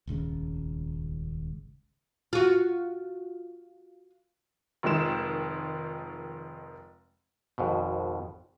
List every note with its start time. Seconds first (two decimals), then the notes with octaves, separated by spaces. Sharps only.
0.07 D#1 G#1 C#2 C#3
2.33 F4 F#4
4.83 F1 D#3 F3 G#3 E7
7.58 G#1 F2 G#2 B2